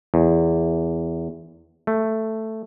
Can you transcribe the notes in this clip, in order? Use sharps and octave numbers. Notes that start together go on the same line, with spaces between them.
E2
A3